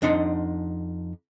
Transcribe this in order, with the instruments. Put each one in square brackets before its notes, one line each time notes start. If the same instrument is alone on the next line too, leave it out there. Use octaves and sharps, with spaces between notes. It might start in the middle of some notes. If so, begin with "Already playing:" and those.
[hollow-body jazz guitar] F2 D4 D#4 F#5 C6